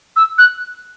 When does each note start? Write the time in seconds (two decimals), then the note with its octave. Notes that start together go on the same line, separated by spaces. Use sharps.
0.16 E6
0.38 F#6